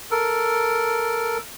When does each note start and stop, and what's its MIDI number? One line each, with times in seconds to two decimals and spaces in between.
0.11 1.38 69
0.11 1.38 70